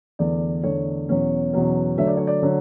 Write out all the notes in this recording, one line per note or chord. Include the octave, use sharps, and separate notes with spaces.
E2 D3 A3 D4 D5
E2 D3 A3 D4 C#5
E2 B2 F#3 C#4
E2 B2 F#3 C#4
D3 F#3 A3 D4 E5
D5
C#5
D5
D3 F#3 A3